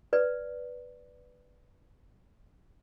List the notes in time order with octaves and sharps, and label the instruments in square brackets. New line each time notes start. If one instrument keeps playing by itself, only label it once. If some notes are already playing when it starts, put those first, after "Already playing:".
[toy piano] B4 D5